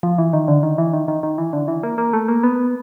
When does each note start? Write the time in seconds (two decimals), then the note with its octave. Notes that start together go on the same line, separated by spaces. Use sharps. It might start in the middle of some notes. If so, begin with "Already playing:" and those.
0.03 F3
0.18 E3
0.33 D#3
0.48 D3
0.63 D#3
0.78 E3
0.93 D#3
1.08 D#3
1.23 D#3
1.38 E3
1.53 D3
1.68 E3
1.83 A#3
1.98 A#3
2.13 A3
2.28 A#3
2.43 B3